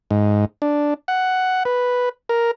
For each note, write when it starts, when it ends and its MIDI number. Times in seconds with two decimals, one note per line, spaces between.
0.11 0.45 44
0.62 0.94 62
1.08 1.63 78
1.65 2.09 71
2.29 2.51 70